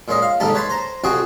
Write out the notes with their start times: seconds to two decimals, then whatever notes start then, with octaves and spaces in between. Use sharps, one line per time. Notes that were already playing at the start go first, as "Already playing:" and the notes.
0.08 A#2 G#3 C#4 D#5
0.22 F5
0.40 D#2 G#2 C3 G3 D#4 A4
0.54 B4 C#5 A5 B5 C6
0.70 C5 A#5
1.04 C2 F2 C4 F#4 G#4 F#5